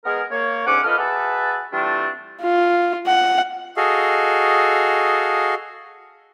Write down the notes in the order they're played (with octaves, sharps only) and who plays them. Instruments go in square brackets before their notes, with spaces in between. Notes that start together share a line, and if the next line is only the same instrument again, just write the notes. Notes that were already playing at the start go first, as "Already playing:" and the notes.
[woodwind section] G#3 B3 G#4 A#4
A#3 C#5
D2 G#2 B2 C#4 F#5 D6
F4 A4 B4 D#5 F6
F#4 G#4 B4 E5 A5
E3 G3 A3 C4 D4 F4
[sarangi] F4
F#5
[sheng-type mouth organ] F#4 G#4 A4 D#5 F5